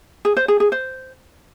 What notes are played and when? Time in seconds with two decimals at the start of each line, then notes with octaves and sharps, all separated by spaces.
0.25 G#4
0.37 C5
0.48 G#4
0.60 G#4
0.72 C5